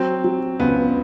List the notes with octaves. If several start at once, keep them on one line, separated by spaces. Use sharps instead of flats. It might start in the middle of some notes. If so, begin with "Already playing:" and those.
Already playing: F#3 C4
F#3
C#2 B3